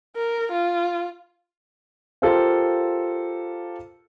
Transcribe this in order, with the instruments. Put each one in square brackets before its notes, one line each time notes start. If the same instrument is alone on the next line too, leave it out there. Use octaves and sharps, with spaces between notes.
[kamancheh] A#4
F4
[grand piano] F4 G4 A4 A#4 C5 F5